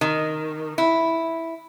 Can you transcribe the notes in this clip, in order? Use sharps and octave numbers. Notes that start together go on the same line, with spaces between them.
D#3
E4